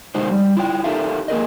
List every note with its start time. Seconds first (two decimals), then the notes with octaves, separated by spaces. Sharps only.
0.15 C3 G#3 D#4 F#4 C5
0.31 G3
0.57 E4 F4 C#5 G5
0.84 D#4 G4 A4 A#4 E5 F5
1.28 A#3 G#4 A#4 D#5